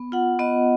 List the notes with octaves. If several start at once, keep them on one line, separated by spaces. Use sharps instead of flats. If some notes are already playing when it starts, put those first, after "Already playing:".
Already playing: B3
F4 F#5
B3 D#5